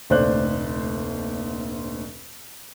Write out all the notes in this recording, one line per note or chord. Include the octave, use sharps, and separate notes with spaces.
F1 D2 A#2 C5 D5 F#6